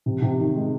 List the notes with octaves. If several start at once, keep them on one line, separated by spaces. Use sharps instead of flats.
C3
C3
D#3
G#3